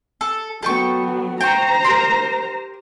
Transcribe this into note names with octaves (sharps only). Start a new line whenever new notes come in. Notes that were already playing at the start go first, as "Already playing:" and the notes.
A4
F#3 B3 A4 G5 C#6
C5 G5 A#5 C#6
G4 A#4 C6